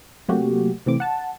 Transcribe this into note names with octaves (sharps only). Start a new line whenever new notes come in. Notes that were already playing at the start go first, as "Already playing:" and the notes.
C3 F#3 A3 A#3 F#4 G4
C3 E3 A3 C4 D6
F#5 A5